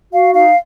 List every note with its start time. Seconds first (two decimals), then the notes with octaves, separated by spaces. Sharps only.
0.12 F#4 F5
0.33 D#4 F5